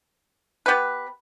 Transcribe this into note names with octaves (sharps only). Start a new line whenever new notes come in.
B3 G4 B4